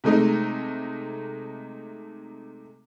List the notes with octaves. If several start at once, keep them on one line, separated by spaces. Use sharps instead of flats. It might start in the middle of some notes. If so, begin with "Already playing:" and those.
C3 G#3 A3 D#4